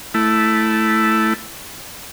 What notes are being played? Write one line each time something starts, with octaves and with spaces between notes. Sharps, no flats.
A3 E4